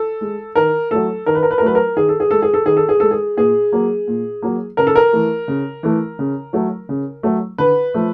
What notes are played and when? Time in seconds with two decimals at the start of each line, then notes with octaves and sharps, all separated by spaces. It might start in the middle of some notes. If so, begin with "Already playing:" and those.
Already playing: A4
0.21 G#3
0.55 D#3 A#4
0.91 F#3 A3 A4
1.26 D#3 A#4
1.35 B4
1.43 A#4
1.51 B4
1.58 A#4
1.62 F#3 A3 B4
1.75 A#4
1.96 D#3 G#4
2.09 A4
2.20 G#4
2.31 G#3 A4
2.42 G#4
2.54 A4
2.66 D#3 G#4
2.77 A4
2.89 G#4
3.00 G#3 A4
3.11 G#4
3.37 A#2 G#4
3.73 F#3 A#3
4.07 A#2
4.42 F#3 A#3
4.77 C#3 A#4
4.87 A4
4.95 A#4
5.13 E3 A3
5.48 C#3
5.83 E3 A3
6.19 C#3
6.53 F#3 A3
6.89 C#3
7.23 F#3 A3
7.58 D3 B4
7.94 F3 A3